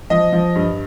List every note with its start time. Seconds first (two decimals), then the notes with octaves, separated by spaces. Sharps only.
0.10 F3 D#5
0.32 F3
0.55 G2